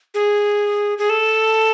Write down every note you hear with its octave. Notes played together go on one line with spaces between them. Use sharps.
G#4
G#4
A4